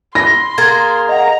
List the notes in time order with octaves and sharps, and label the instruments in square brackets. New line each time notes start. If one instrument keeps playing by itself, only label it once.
[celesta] B5 [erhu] C6 [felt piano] A#6
[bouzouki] A#3 G#4 A#4 [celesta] G#6 A6
[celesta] D#5 F#5 [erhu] A#5